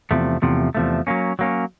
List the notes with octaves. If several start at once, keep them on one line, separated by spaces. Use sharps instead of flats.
E2 C3 F3 A3
E2 C3 F3 A3
E2 C3 F3 A3
F#3 A#3 C#4
F#3 A#3 C#4